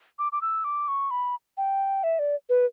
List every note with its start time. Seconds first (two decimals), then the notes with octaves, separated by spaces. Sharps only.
0.19 D6
0.32 D6
0.42 E6
0.64 D6
0.88 C#6
1.11 B5
1.57 G5
2.04 E5
2.19 D5
2.49 B4